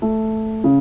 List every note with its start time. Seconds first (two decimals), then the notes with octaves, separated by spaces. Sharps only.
0.02 A3
0.64 C#3